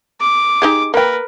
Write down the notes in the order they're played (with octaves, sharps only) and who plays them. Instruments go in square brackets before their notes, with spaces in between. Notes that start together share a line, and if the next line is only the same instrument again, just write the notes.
[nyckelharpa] D6
[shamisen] D#4 G4 G#4
[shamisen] A#3 G5 [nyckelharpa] A#4 B4